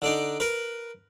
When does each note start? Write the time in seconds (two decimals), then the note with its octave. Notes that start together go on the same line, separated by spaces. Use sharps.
0.02 D3 D4 D#4
0.40 A#4 B4